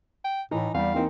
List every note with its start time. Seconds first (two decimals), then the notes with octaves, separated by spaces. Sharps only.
0.24 G5
0.51 A2 E3 D#4
0.74 E2 G3 F5
0.94 E3 A#3 C4 D#4